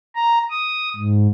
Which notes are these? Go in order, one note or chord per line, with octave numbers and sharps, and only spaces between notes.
A#5
D#6
G#2